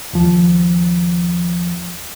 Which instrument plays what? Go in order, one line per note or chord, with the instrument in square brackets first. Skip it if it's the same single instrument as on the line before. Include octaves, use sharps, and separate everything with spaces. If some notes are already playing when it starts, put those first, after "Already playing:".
[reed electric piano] D#2 F3